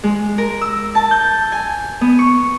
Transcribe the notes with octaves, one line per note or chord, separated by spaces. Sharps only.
G#3
A#4
E6
A5
G6
G#5
B3
C#6